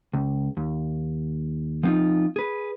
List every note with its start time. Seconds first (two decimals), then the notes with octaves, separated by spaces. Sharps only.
0.14 C#2
0.57 D#2
1.83 F3 B3 C4 D4 D#4 F4
2.36 G#4 B4